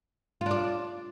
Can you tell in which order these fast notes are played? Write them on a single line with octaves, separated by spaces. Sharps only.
F4 D4 D5